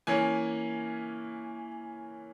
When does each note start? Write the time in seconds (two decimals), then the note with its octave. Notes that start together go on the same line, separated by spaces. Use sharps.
0.07 E3 A#3 C#4 G#5